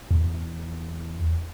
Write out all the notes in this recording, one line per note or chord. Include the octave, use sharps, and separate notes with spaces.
E2